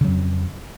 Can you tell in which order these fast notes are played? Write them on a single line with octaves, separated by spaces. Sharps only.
C#3 F#3 F2